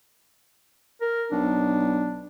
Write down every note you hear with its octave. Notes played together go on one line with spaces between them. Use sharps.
A#4
B1 D4